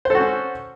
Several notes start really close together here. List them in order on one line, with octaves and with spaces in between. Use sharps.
C5 A4 F#4 C#4